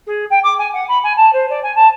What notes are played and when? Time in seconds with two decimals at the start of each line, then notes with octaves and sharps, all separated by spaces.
0.07 G#4
0.30 G5
0.44 D6
0.59 G#5
0.74 F#5
0.88 B5
1.04 G#5
1.17 A5
1.33 C5
1.50 D5
1.63 G#5
1.76 A5